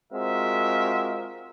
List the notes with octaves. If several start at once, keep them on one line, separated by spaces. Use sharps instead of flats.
G#3 C4 F4 F#4 A#4 E5